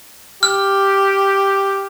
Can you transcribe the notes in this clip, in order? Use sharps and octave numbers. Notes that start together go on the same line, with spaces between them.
G4 F6